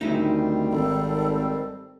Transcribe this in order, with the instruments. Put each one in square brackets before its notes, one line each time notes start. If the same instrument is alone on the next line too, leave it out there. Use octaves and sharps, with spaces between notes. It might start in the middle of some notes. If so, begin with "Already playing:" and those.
[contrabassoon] D2 [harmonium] D#3 G3 C4 [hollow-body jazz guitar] D#4 E4 G#4
[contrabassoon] G#1 [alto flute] A4